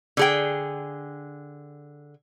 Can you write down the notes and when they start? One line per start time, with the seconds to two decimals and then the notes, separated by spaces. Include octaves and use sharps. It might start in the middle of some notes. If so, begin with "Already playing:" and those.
0.17 D3 G#4 G5